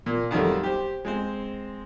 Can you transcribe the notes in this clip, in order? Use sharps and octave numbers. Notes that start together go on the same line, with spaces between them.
A#2 A#3
F2 D#3 F#3 G3 A3
G4 C5
G#3 C4 C5